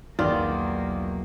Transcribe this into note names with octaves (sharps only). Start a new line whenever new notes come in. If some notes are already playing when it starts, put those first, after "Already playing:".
B1 E2 D#3 A#3 F4 D5